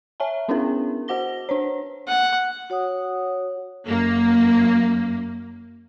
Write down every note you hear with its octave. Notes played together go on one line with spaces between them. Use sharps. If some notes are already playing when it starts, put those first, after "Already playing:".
C#5 E5 G#5 A5
B3 C#4 D4 E4 G#4 A#4
F#4 C5 F#5 D6 A#6 G7
D4 C5 C#5
F#5
F#4 C#5 F#5 D#6
F#2 A#3